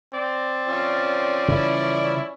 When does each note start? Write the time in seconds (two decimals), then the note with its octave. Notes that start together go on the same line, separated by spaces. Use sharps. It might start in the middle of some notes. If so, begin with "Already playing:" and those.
0.14 C4 D5
0.66 F3 C#4
1.48 C#3 E3 G3 E4